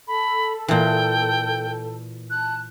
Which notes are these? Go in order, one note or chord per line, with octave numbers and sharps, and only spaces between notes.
A4 A5 B5
A#2 E3 G5
A5 F#6